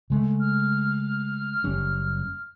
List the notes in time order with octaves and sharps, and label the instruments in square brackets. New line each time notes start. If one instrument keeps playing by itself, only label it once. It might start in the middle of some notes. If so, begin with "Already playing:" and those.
[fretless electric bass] C#3 G#3 A3
[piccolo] F6
[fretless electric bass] F#1 G3 C#4